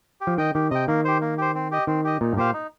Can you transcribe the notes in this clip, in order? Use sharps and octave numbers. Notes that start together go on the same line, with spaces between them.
G4
F3
D#3 D#5 G5
D#3 G4
C3 D#5 G5
D#3 A#3
G4 C5
A#3
G4 C5
C4
G4 D#5
D#3 C4
G4 D#5
A#2 D#4
G2
A#2 G4 C5 F5
D#4